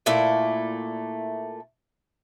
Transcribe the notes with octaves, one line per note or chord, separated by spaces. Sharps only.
A#2 A3 E4 D5